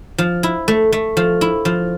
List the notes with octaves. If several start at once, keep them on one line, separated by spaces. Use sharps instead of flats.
F3
E4
A3
A3
F3
E4
F3